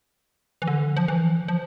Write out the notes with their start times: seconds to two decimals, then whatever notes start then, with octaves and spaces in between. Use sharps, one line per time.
0.62 E3
0.67 D3
0.97 F3
1.08 E3
1.48 F3